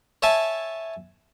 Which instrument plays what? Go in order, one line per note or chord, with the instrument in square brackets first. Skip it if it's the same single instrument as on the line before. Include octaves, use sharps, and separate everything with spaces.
[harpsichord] C#5 E5 G#5 A5